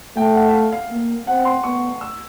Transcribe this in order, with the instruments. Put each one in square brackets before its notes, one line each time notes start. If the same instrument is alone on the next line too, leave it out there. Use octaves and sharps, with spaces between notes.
[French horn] A3 [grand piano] G5
[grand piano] F#5
E5
F5
F5
[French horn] A#3
[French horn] C4 [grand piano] F#5
[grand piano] C6
[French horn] B3 [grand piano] C#6
[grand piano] E6